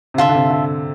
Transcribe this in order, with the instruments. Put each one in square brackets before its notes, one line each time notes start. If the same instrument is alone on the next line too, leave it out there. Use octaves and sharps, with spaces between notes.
[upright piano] C3
[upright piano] D3 [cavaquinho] F4 A4 E5
[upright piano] D3
C3
D3